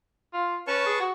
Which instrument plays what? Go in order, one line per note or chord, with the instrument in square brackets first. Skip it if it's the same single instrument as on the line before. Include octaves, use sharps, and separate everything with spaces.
[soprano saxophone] F4
[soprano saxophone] C#4 [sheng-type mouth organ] B4 A5 C#6
[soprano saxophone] G#4
F#4